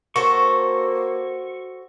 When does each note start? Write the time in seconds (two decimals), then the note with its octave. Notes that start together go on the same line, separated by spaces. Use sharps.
0.16 A#3 F#4 A4 C5 C#6